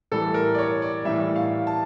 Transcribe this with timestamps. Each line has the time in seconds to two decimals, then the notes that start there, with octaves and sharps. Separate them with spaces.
0.11 A2 E3 G3 A4
0.34 A#4
0.54 D5
0.59 C#5
0.82 D5
1.05 A2 E3 G3 E5
1.36 F5
1.67 A5